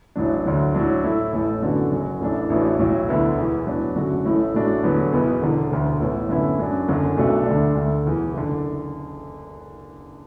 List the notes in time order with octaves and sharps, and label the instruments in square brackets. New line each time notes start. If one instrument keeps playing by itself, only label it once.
[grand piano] A1 A2 F#3 D4
D2 D3 F#3
A2 F#3 D4
A2 A3 E4
A1 A2 A3
F#2 D3 B3 D4 F#4
F#1 F#2 F#3
A1 A2 E3 A3 D4
A1 A2 E3 D4 F#4
B1 A2 F#3
D2 D3 B3 E4
E1 E2 E3
A2 F#3 B3 D4
F#1 F#2 D3 A3 F#4
A1 A2 A3 E4
A1 A2 A3 D4 F#4
E2 D3 F#3 B3
F#1 E2 B2 B3
E1 E2 D3
E1 D2 D3
A1 A2 E3 B3
F#2 D3 B3 E4
F#2 F#3 D4
F#1 F#2 D3
B1 B2 A3 D4 F#4
D2 D3 A3 D4
D2 D3 A3
E1 E2 E3
F#1 D3